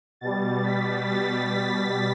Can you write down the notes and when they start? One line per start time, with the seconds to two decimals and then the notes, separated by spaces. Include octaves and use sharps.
0.21 B2 G3 A6
0.64 B6
1.08 A6
1.53 B6